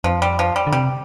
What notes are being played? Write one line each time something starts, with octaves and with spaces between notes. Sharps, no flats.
F2 F3
G3
F3
G3
D3
C3 G3